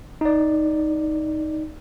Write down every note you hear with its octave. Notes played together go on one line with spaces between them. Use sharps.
D#4 D5